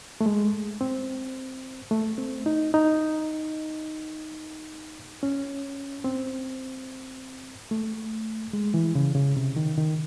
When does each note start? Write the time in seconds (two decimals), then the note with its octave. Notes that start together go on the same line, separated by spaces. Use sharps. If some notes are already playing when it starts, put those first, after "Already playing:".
0.21 A3
0.26 G#3
0.81 C4
1.91 A3
2.18 C4
2.46 D#4
2.74 D#4
5.23 C#4
6.04 C4
7.71 A3
8.53 G#3
8.74 E3
8.95 C#3
9.15 C#3
9.37 C3
9.56 D#3
9.78 D#3